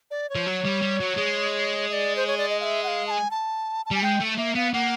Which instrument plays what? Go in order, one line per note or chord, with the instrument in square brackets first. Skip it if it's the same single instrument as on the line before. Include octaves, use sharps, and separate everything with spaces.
[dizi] D5
C#5
[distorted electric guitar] F3
F#3
G3
G3
F#3
G#3
[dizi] D#5
D5
C5
C#5
D5
D#5
F5
E5
F#5
F5
A5
G#5
A5
A5
[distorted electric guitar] G3 [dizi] G#5
[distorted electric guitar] G#3 [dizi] G5
[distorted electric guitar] A3
[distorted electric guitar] A#3 [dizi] E5
[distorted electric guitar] B3 [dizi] F5
[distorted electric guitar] A#3 [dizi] F#5